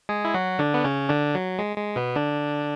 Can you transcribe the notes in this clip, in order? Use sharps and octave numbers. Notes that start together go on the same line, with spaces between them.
G#3 G#4
E4
F#3 F#4
D3 D4
B3
C#3 C#4
D3 D4
F#3
G#3
G#3
B2 B3
D3 D4